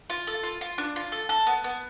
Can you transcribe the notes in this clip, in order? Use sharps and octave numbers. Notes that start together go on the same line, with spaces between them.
F4
A4
F4
F4
D4
F4
A4
A4
B3
B3